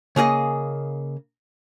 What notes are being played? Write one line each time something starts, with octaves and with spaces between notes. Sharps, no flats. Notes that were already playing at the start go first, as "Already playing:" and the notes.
C#3 A#3 G#4 D#5